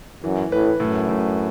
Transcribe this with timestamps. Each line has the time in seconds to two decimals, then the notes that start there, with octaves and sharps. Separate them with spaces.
0.24 F#2 E3
0.52 A2 B4
0.80 F#2 A2
1.09 A2